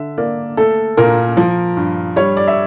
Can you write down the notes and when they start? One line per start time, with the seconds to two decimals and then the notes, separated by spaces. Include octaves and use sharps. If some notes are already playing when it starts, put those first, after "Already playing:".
Already playing: D3 E5
0.18 A#3 D5
0.57 A3 A4
0.97 A#2 A#4
1.37 F3
1.77 G2
2.16 G3 C#5
2.37 D5
2.48 E5